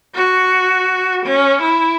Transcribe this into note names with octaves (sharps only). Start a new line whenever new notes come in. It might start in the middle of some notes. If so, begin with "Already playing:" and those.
F#4
C#4
E4